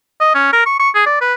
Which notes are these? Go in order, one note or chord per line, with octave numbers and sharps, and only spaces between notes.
D#5
C#4
A#4
C#6
C#6
G#4
D5
B4